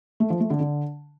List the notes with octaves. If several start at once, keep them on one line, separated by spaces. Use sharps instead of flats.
A3
F3
A3
D3
D3